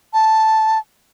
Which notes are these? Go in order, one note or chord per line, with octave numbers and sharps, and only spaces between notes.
A5